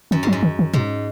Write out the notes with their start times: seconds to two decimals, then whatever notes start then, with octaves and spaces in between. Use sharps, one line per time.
0.11 F#2 D#3
0.23 G#2 F#3
0.33 F#2
0.43 D#3
0.59 D#3
0.73 G#2 B2